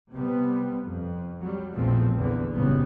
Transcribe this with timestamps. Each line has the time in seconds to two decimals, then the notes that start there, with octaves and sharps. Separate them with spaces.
0.12 C3 G3 B3
0.86 F2
1.39 F#3 G3
1.72 A#1 E2 B2 F3 A3 C4
2.16 E2 A#2 D3 E3
2.53 F#1 G#2 C#3 G3 B3